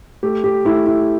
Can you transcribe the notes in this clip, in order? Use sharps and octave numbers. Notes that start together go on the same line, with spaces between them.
A3 G4
G4
A3 E4
E4